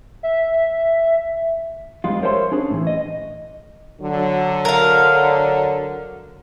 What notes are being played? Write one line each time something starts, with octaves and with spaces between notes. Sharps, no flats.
E5
F2 G3 G#3 F4
A#4 C5 C#5 E5 F#5 C6
C#4 D4 G#4
A2 E3
D#5
D3 F#3
A#4 F5